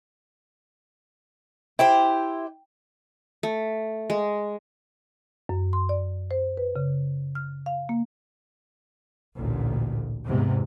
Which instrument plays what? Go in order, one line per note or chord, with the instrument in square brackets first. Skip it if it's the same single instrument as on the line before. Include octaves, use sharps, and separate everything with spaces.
[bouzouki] E4 G4 C5 [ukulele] G5
[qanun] A3
G#3
[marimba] F#2
C6
D5
C5
B4
C#3
F6
F5
A#3
[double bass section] A1 D2 A#2
E2 G#2 C3